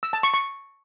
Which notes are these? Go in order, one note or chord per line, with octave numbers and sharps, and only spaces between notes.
E6
A5
C#6
C#6